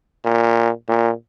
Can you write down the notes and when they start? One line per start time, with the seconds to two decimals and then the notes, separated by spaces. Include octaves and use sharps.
0.25 A#2
0.89 A#2